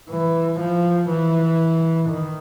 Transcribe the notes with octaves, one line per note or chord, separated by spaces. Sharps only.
E3
F3
E3
D#3